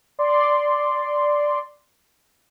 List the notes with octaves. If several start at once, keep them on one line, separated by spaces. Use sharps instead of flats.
D5 C6